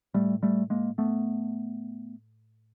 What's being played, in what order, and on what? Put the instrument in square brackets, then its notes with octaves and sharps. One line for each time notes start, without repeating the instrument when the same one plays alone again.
[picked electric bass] A2 G3 A3
G3 A3
G#3 A#3
A3 B3